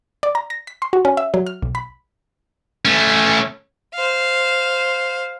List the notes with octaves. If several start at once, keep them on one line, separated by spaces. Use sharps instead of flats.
D5
A#5
A#6
B6
C6
F#4
C#4
E5
F#3
F6
B1
B5
A3 C#4
C5 F5